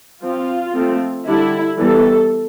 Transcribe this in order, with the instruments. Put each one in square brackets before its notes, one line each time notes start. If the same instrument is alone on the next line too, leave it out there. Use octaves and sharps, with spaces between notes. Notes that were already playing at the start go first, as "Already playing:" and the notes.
[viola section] F3 C4 F4
F3 A3 C4
D3 G3 D4 E4
E3 G3 B3 A4